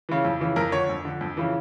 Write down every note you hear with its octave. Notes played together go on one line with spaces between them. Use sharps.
C#3 E3
F2
C#3 E3
F2 A#4
D3 C#5
F2
D3
F2
C#3 E3